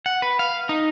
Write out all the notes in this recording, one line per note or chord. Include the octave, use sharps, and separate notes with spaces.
F#5
B4
F5
D#4